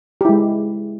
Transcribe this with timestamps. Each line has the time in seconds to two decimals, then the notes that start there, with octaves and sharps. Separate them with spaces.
0.21 G4
0.25 E4
0.29 G#3